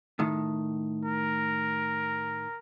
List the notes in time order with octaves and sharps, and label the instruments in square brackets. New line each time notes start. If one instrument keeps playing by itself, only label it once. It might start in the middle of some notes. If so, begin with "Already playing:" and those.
[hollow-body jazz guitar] A2 D#3
[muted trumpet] A#4